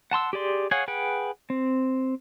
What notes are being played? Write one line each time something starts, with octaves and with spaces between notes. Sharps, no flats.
F#5 A5 C6 E6
G4 G#4 D5 C6
G#4 C#5 F5 F#5 G#5
G#4 B4 F#5 G5
C4